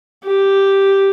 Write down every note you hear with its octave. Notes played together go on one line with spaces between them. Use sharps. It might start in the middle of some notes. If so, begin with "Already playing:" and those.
G4